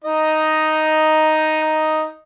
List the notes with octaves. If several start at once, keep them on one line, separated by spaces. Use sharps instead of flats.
D#4 D#5